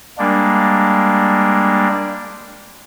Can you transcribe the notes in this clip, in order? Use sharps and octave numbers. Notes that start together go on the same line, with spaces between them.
G3 G#3 A#3 D4